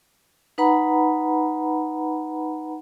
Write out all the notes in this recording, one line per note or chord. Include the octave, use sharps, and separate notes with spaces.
D#4 B4 F#5 A#5 B5